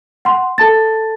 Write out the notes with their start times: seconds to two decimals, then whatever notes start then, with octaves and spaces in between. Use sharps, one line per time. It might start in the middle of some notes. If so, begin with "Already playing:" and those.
0.25 F#5 C6
0.58 A4 A5 A6